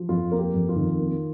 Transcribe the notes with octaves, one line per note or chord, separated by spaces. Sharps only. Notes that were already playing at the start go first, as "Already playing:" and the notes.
Already playing: F3
F2 F4
A#3
G4
F2
F4
D#3
A#3